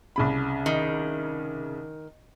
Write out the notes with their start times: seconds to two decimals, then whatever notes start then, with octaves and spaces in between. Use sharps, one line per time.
0.16 C2 C#3 B5
0.66 D#3